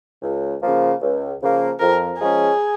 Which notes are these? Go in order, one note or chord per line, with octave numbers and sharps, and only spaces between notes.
C#2
C#3 F3 A#3
C#2
C#3 F3 A#3
F2 A#4
F3 G#3 C#4 G#4